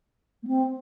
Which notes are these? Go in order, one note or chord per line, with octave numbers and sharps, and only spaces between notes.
A#3
C4